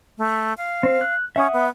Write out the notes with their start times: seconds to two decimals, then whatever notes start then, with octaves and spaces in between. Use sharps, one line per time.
0.18 A3
0.57 F5
0.83 C4
1.01 F#6
1.36 C#4 E5 F#5 D#6
1.53 B3